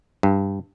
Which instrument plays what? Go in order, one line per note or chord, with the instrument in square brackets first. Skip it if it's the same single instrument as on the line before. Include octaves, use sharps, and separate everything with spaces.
[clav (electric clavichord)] G2